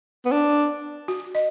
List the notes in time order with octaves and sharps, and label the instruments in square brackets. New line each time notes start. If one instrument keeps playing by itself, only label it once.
[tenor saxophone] B3
D4
[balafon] F#4
D#5